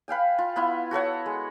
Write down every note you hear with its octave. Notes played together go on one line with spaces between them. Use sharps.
B4 F5 G5 G#5
F4
B3 E4 F4 B4
F#4 A4 C#5 F#5
G#3